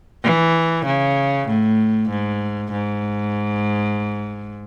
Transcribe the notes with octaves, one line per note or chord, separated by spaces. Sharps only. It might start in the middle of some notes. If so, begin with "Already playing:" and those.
E3
C#3
A2
G#2
G#2